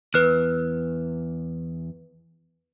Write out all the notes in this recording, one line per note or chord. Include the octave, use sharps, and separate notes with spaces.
E2 B4 F6 F#6